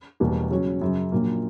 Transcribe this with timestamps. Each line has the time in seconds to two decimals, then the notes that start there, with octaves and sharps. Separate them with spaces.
0.20 E1 E2 B2 G3 A#3
0.51 C#3 F#3 C#4 F#4
0.81 F#2 C#3 F#3
1.12 A#1 A#2 F#3 A#3